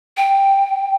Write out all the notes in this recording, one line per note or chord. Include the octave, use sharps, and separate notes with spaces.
G5